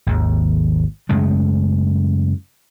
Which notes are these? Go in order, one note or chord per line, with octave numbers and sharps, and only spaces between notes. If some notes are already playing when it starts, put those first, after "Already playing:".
G#1 D#2
F#2 C#3 G#3 A3